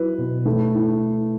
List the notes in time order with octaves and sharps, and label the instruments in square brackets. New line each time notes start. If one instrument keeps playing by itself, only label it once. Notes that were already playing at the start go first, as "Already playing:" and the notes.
Already playing: [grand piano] F#3 E4 B4
B2
A3
E4